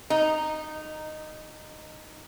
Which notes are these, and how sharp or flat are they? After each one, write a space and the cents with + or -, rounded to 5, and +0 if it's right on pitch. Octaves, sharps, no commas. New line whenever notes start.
D#4 -10